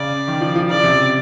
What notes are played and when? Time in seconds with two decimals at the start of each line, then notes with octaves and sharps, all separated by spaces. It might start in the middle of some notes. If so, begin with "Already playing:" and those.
Already playing: C#3 D5
0.28 D#3
0.41 F3
0.55 F3
0.69 C#3 D5
0.84 C3